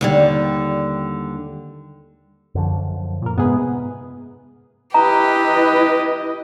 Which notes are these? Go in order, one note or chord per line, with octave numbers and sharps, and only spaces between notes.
D#2 D3 G3
F#2 D3 F3
A#2 A#4
G#2 C3 G#3 B3 G#4 B4
E4 G4 B4 D#5 A#5